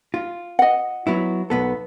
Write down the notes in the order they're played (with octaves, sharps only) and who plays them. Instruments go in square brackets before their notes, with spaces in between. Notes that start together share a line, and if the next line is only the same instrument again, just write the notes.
[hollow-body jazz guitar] F4
[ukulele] D#5 F#5
[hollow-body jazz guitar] F#3 B3 E4
B1 B3 A4